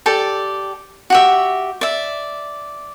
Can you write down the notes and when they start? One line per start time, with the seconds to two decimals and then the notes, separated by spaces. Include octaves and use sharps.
0.06 G4 A4 D5
1.10 F#4 G4 E5
1.81 D5 E5